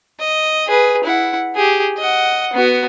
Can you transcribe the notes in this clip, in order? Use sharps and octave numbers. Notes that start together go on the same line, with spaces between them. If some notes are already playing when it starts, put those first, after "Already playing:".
D#5
G#4 B4
E4 F#5
G4 G#4
D#5 F#5
B3 F#4